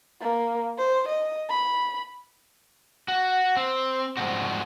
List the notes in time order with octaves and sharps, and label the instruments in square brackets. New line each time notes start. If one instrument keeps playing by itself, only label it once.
[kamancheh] A#3
C5
D#5
B5
[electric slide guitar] F#4
C4
G#2 B2 F3 G3 C4 F#4